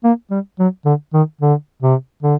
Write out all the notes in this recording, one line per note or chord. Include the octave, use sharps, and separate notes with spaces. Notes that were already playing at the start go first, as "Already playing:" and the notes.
A#3
G3
F#3
D3
D#3
D3
C3
D3